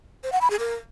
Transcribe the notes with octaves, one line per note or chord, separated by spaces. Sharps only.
C5
F#5
B5
G#4
A#4